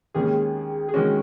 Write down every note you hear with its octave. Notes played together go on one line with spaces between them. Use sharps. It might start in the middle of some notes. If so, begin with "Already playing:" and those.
D#2 D#3 G#3 C#4 G#4
G#4
D#3 G#3 C#4 F#4